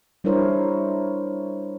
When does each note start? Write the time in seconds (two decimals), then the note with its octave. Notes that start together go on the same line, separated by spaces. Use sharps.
0.24 G3 D4 E4 A#4 C5 C#5